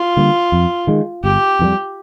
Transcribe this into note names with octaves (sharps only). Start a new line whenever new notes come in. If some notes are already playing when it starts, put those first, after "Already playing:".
Already playing: F4
D3 G3 A#3
F2
D#3 G#3
G1 G4
F2 D#3 G3